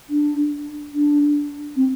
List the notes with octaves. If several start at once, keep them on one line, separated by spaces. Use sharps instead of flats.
D4
D4
C4